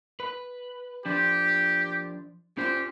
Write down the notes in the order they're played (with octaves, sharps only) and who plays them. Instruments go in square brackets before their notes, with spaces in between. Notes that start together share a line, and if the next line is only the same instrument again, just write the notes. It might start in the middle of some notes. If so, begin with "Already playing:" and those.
[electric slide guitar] B4
[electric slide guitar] F3 D4 [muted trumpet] G4
[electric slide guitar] C#4 F4 C5 [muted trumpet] G4